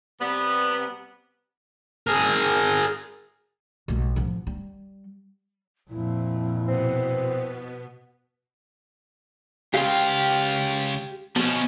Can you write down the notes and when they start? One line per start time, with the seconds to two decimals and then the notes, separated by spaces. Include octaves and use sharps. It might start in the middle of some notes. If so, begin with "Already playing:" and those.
0.20 C3 G3 B3
2.07 G#4 A#4
3.88 B1 G#3
4.16 A1 F3
4.47 G3
5.90 F2 A#2 E4
6.68 B2 B3 C4
9.74 C#2 F4 G4 F5 G5
11.36 B2 F3 C#4